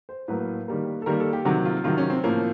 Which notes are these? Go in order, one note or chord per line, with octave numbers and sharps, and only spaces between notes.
C5
A2 F#3 A#3 B4
D#3 G3 A#3
A4
D#3 G3 A#3 A#4
A4
G4
C3 D#3 F#3 F#4
F4
C3 D#3 F#3 F4
C#4
C4
A2 F3 A#3 C#4